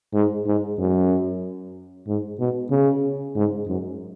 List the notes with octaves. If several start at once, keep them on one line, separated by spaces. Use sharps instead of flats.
G#2
G#2
F#2
G#2
B2
C#3
G#2
F#2